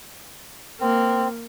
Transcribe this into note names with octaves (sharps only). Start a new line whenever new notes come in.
A#3 C4